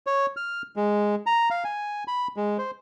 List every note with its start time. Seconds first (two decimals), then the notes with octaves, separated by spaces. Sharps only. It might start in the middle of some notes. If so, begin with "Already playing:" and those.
0.07 C#5
0.37 F6
0.76 G#3
1.26 A#5
1.50 F5
1.64 G#5
2.08 B5
2.37 G#3
2.58 C5